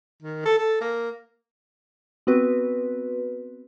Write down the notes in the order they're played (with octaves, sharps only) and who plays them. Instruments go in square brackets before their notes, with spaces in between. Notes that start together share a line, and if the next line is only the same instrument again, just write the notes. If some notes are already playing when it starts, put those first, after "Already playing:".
[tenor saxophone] D#3
A4
A4
A#3
[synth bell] B3 C4 F#4 B4